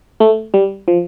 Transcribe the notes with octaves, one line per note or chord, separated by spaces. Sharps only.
A3
G3
F3